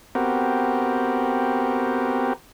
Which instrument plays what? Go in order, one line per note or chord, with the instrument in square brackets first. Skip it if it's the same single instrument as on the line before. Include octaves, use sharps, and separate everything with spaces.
[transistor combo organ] B3 C4 F#4 G4 A#4